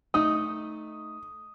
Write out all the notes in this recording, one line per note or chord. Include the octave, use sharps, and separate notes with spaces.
A3 D#4 D#6